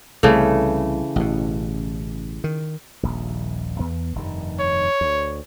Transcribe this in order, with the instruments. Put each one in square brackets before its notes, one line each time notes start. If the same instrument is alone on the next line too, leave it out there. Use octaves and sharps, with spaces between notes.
[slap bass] C2 [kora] C#3 E3 A3
[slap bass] A1 B2
D#3
D#1 A#1
E2 B3
F1 G2 D#3
[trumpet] C#5
[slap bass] D2